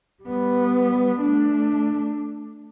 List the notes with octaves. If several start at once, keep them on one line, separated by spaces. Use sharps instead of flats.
G3 B3
A3 D4